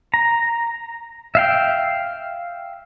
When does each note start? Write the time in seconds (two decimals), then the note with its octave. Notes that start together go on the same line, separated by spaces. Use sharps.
0.14 A#5
1.35 E5 F5 G5